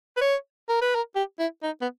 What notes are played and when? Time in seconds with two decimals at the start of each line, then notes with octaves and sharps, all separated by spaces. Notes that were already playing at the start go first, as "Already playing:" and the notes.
0.17 B4
0.21 C#5
0.69 A#4
0.82 B4
0.95 A#4
1.16 G4
1.40 E4
1.63 D#4
1.82 B3